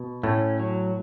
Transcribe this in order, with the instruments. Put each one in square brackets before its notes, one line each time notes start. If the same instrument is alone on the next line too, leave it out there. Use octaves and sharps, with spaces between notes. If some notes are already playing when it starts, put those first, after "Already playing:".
Already playing: [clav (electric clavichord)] B2
[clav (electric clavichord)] A2 A3 [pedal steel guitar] C#4
[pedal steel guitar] F#3